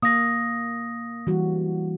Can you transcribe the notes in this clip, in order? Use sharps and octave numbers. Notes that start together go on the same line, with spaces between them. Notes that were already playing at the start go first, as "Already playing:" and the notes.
A#3 F5 D#6 A#6
E3 G3 F#4